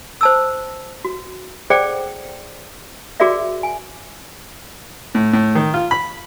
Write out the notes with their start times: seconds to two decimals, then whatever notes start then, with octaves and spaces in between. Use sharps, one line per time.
0.21 C5 A5 E6
1.05 F#4
1.70 G#4 A4 C5 D5 F#5 G5
3.20 F#4 G#4 A#4 D5 E5
3.63 G#5
5.15 A2
5.33 A2
5.55 D#3
5.74 F4
5.91 B5